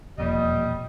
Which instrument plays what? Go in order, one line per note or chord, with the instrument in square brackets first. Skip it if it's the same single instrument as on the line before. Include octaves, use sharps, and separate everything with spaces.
[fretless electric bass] E1 F2 A#2 [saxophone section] G3 D#5